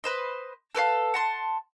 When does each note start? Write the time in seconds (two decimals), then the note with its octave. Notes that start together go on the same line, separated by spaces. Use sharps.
0.04 B4 C5 D#5
0.75 A4 B4 C#5 F5
1.14 F#5 A5 C6